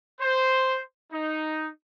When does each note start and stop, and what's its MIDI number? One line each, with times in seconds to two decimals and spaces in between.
0.21 0.79 72
1.13 1.68 63